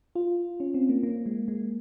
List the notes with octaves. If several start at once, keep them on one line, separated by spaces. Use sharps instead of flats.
F4
C#4
C4
A#3
A#3
G#3
G#3